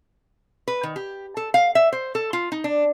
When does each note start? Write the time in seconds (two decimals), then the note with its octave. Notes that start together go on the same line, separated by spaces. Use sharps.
0.68 B4
0.83 D#3
0.96 G4
1.37 A4
1.54 F5
1.75 E5
1.93 C5
2.15 A4
2.33 F4
2.52 D#4
2.64 D4